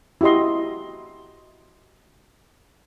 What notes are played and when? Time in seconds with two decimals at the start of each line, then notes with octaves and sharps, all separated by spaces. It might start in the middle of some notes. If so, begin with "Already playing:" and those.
0.21 E4 F#4 G4 D#5 C6